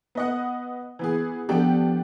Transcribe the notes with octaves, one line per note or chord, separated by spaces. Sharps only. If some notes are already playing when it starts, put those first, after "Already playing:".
B3 D#5 F#5
E3 B3 G#4
F3 B3 D4 G4 A4